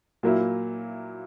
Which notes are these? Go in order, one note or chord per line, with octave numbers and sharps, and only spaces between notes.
A#2 F#3 A#3 E4